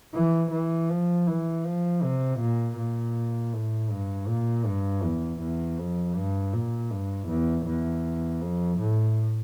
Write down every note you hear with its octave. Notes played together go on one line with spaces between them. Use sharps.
E3
E3
F3
E3
F3
C3
A#2
A#2
A2
G2
A#2
G2
E2
E2
F2
G2
A#2
G2
E2
E2
F2
A2